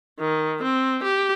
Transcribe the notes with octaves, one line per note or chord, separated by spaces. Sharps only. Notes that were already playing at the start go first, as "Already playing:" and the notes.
D#3
C4
G4